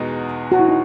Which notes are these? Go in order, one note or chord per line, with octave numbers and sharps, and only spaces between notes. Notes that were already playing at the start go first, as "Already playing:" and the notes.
Already playing: E2 B2 G#3 D#4 F#4
F#4
E4
D#4